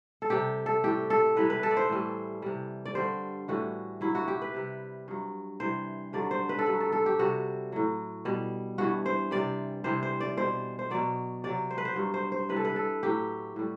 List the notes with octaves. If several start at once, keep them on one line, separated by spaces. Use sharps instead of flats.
A4
C3 G3 G4
A4
A2 G3 G4
A4
C3 E3 G3 B4
B4
A4
D5
C5
A2 E3 G3
C3 G3
D5
G2 D3 G3 C5
A2 E3 G3 F#4
G2 F#3 E4
F#4
G4
B4
C3 G3
G2 F#3
C3 E3 G3 C5
G2 D3 F#3 D5
C5
B4
A4
G2 F#3 B4
A4
A4
G4
C3 G3 F#4
A2 F#3
B2 G3
G2 E3 G3 F#4
C5
C3 G3 D5
C3 E3 G3 C5
C5
D5
B2 G3 C5
C5
B2 F#3 D5
C3 F#3 D5
C5
B4
C5
G2 F#3
C5
C5
C3 E3 G3 B4
A4
B4
A4
A2 F#3 G4
A2 G3